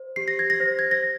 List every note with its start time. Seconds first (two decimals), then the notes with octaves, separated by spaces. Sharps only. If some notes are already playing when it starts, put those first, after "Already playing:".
Already playing: C5
0.16 G4 C7
0.28 A#6
0.39 G#6
0.50 A#6
0.60 C5
0.79 G#6
0.91 A#6